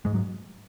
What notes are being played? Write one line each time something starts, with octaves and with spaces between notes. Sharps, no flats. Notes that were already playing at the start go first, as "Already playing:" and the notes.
G#2 G#3
F#3